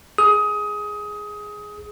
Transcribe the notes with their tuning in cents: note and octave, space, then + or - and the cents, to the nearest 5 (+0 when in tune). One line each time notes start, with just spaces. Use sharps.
G#4 +0 D#6 +20